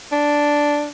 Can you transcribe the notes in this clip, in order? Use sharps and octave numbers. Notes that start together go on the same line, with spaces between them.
D4